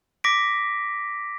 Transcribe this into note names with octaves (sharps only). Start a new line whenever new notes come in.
D6 A#6 B6 D7